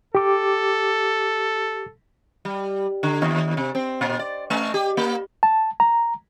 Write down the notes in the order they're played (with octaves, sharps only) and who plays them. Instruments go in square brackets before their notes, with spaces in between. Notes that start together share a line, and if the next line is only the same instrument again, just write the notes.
[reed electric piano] G4 D6 [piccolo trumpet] A4
[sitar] G3
D3
D#2
C3
C4
A#2
D5
A3
G4
A#3
[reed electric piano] A5
A#5